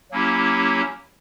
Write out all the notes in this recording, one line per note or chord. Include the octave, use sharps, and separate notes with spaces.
F#3 A#3 C#4 E4 G4